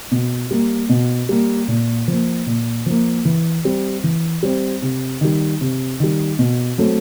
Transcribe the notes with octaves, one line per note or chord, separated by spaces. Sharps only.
B2
G3 A#3
B2
G3 A#3
A#2
F3 A#3
A#2
F3 A#3
E3
G3 C4
E3
G3 C4
C3
D#3 G3
C3
D#3 G3
B2
F#3 A3 C4